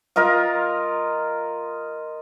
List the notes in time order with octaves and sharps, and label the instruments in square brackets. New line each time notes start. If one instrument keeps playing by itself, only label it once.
[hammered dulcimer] F4 A#4 D#5 F5